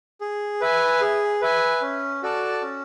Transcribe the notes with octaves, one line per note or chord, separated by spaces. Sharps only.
G#4
B4 E5 G#5
G#4
B4 E5 G#5
C#4
F#4 A4 D5 A5
C#4